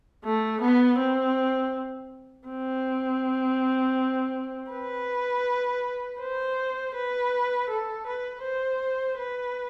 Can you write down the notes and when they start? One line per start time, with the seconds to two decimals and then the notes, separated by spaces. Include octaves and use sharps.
0.24 A3
0.62 B3
0.99 C4
2.48 C4
4.71 B4
6.20 C5
6.95 B4
7.70 A4
8.07 B4
8.44 C5
9.18 B4